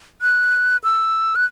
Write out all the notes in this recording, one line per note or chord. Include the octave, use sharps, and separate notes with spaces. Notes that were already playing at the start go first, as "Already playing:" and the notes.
F#6
E6
F#6